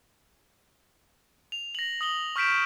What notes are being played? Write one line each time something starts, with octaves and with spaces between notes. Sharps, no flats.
F7
A#6 F#7
D#6 F#7 G7
C#6 F6 G6 B6 D7 E7